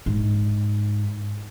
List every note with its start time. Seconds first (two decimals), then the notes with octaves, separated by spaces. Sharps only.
0.06 G#2